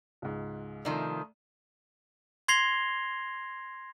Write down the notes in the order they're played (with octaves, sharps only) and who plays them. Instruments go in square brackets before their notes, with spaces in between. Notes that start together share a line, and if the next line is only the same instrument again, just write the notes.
[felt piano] C#2 G#2
[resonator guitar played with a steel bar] C3 D#3 F3 [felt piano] A3 D5
[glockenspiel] C6 G#6 A#6 C7 F7 G7